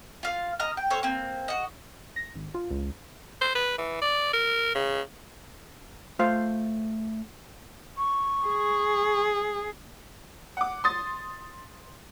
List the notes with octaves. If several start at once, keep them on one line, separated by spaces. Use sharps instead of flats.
F4 F5
D#5 A#5 F6
G5
A4 C5 C#5 F5
A#3 C4
F#4 D#5
A#6
G#1
F4
C#2
C5
B4
E3
D5
A#4
C#3
A3 F4 C5 F5
C#6
G#4
F#5 D6
C6 D#6 A6